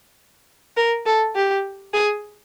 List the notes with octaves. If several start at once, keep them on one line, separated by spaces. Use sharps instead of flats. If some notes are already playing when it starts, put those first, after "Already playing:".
A#4
A4
G4
G#4